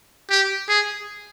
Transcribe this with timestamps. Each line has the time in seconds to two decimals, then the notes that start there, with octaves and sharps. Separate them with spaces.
0.30 G4
0.69 G#4